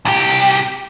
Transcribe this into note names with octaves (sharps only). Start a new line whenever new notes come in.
C2 G4